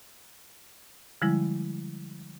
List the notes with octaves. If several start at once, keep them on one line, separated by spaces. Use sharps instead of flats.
D3 F3 G3 G#3 E4